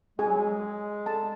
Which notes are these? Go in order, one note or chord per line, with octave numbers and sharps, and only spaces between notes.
G#3 G#4 G#5
F#3
G#3
A4 A5